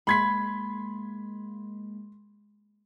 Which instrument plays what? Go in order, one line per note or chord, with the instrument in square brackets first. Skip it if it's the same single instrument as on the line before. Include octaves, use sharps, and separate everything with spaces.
[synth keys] G#3 A#3 [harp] B5 [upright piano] C6 G#6 B6